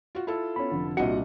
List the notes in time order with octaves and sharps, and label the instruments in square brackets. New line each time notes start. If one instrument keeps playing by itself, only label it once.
[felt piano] F4 F#4
E4 F4 A4
[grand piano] B3 C#4 [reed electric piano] B5
[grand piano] F1 D3
[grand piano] C2 D4 C#7 [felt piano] A#2 D#5 F#5 [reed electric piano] F#4